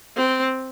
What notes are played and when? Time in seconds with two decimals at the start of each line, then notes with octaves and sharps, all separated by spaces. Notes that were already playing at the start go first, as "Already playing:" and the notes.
0.17 C4